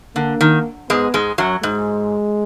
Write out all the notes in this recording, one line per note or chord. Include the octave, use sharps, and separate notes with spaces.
D3 A#3
D#3
G#2 G#3 B3
G#2 G#3
F#2 F#3
G#2 G#3